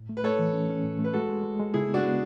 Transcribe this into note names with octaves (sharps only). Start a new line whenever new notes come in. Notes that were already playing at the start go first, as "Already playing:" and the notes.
Already playing: A2
A3
B4
A3 A4 C#5
E3
C#4
C#4
A2
A3
B4
G#3 F#4 A4
G#3
G#3
G#3
C#3 E4 G#4
B3
D4 F#4
B3